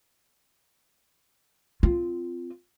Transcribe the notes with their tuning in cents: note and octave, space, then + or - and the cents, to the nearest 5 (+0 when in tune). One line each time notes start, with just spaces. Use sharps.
C4 -20 F4 -10